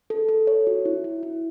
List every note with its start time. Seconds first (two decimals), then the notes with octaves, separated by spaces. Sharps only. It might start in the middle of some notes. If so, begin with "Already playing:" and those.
0.10 A4
0.29 A4
0.47 C#5
0.67 F#4
0.85 E4
1.04 E4
1.23 E4